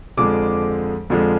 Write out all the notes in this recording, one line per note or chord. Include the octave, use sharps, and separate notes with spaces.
F2 D3 F3 G#3 D6
F2 D3 F3 G#3